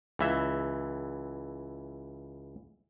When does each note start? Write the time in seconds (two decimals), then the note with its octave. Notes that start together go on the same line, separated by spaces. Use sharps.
0.19 C#2 E3 E5